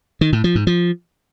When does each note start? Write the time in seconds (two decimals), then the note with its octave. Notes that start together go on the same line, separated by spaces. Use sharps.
0.21 D#3
0.33 A2
0.44 F3
0.55 G#2
0.67 F3